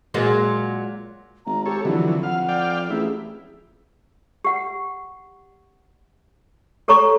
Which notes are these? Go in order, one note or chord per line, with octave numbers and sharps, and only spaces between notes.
A#2 F#3 G#3
G#1 A#5
G4 A4 C#5
F2 D3 E3 F#3 E4
F5 F#5
D5 F5 G5
A1 E4 G#4
G4 F#5
G4 A4 C#5 A#5 C#6